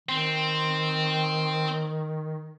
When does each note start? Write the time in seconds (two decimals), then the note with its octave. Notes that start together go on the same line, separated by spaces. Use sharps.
0.09 D#3 C4